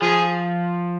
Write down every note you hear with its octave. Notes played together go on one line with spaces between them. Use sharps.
F3 F4 G#4